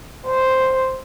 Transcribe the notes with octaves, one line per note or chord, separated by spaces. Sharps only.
C5